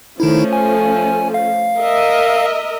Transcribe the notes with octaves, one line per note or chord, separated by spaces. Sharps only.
D#3 F3 A3 C#4 D#4 E4
G#5
F5
A#4 D#5 E5